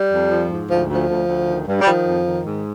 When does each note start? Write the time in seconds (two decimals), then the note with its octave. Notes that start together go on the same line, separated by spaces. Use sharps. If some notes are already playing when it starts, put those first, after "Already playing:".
Already playing: G3
0.11 F2
0.30 F3
0.50 G#2
0.69 D2 F3
0.89 D2
0.95 F3
1.08 D2
1.28 D2
1.47 D#3
1.67 G2
1.81 G3
1.86 D#3 F3
2.06 F2
2.25 D#3
2.45 G#2